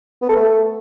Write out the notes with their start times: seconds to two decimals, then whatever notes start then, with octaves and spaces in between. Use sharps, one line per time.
0.22 B3
0.29 A4
0.36 A3